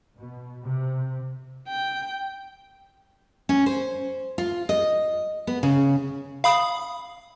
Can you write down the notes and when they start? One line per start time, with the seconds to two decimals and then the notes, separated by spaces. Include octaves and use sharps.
0.17 B2
0.63 C3
1.68 G5
3.49 C#4
3.66 C5
4.38 F4
4.69 D#5
5.47 B3
5.63 C#3
6.44 F5 B5 D#6